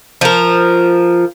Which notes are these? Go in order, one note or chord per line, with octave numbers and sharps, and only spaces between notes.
F3 A#4